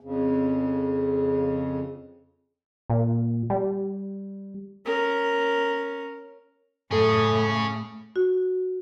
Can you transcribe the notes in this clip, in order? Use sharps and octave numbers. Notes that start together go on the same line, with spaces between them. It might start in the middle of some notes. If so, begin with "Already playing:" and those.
F2 C#3
A#2
G3
C#4 A#4
F#2 A2 C#4 G#4 A4
F#4